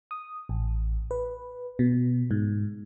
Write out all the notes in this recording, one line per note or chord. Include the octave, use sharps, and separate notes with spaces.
D#6
A1
B4
B2
G#2